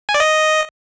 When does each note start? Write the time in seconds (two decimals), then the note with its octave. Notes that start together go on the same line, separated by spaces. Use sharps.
0.09 G#5
0.14 D5
0.20 D#5